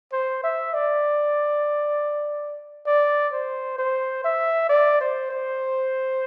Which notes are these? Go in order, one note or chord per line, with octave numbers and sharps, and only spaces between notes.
C5
E5
D5
D5
C5
C5
E5
D5
C5
C5